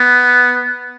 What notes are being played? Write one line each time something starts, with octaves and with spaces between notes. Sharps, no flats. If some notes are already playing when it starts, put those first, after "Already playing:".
Already playing: B3